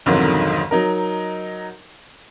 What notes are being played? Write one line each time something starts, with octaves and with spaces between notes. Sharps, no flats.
B1 F2 G#2 D3 D#3 F#3
F#3 D#4 A#4